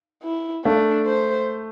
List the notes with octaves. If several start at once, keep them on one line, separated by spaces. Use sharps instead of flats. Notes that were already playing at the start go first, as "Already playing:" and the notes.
E4
A3 D4
C5